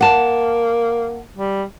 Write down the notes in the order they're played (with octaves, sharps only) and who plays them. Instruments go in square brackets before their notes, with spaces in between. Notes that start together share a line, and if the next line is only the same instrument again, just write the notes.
[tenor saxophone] A#3 [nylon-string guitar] F#5 A5
[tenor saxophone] G3